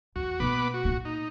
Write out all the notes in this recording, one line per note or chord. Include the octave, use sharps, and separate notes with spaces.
E2 E3 F#4
B2 A#3 B3 B5 D6
F#4
A#2 A#3
D#4